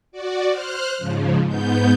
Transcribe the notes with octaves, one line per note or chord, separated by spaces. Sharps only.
F#4 D5
C5 F6 F#6
G#2 C#3 F3
G#2 B3 G6